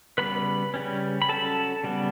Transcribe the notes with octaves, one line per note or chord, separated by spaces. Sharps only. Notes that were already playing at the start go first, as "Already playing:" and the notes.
C#3 G3 B3 B4 B5
C#3 G3 C#4
B5
F#3 C#4 A4 A5
C#3 G3 B3